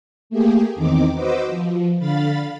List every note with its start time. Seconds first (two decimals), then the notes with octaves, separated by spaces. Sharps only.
0.30 A3 A#3 G4 G#4
0.75 E2 D#3 C4 D#4 D6
1.14 F#4 B4 C5 D#5 D6 E6
1.47 F3
1.99 D3 F5 B5 A6